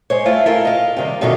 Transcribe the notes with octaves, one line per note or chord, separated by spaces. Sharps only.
G#3 C5 C#5
A3 E4 F4
E4 F4 A#4
D#5 F5
C3 D#3 G3
F#2 B2 D3 D#3 D#4 F4